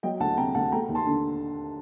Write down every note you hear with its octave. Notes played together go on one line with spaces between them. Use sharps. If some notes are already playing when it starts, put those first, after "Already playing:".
F#3 D#5 G5
D2 F#5 A5
C3 G5 A#5
D2 F#5 A5
A3 G5 A#5
D#2
A5 C6
D3